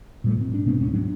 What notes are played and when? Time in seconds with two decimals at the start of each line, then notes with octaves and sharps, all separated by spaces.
0.24 A#2 G3 A3
0.37 G#2 C4
0.54 D4
0.66 B2 A3 B3 C4
0.80 D1 G#2 G#3 C#4
0.93 F#3 D4